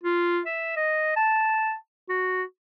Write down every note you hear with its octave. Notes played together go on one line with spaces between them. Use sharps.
F4
E5
D#5
A5
F#4